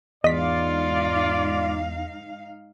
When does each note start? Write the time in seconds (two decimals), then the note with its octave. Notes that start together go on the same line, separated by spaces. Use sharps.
0.24 E2 G#2 D#4 F4 D5 D#5 F5 B6